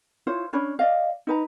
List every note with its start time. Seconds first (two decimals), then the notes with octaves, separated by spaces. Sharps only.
0.27 E4 F4 C5 C#5
0.53 C#4 D4 C#5 B5
0.79 D5 D#5 F5
1.27 D#4 B4 A#5